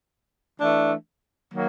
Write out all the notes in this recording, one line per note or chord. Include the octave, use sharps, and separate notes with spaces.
E3 A3 D4
D#3 F#3 A#3